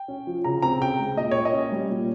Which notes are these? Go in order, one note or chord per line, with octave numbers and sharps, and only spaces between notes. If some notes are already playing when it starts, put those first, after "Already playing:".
Already playing: G5
C#4
F3
C#3 A#5
C4 A#5
C#3 G5
G#3
A#2 D#5
A#3 C#5
D#5
C#4
G3
A#2